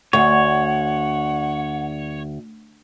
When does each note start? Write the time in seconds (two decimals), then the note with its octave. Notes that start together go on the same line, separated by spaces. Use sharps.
0.13 D2 C#5 F#5